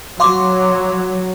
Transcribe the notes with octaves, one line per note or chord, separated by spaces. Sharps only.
F#3 F5 C6 D6